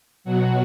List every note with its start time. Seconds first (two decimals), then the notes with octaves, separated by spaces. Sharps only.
0.24 B2 F#3 F#4